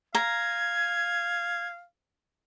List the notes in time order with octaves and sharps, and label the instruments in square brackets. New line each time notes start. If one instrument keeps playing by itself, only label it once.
[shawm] F5 [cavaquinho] A#5 [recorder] G#6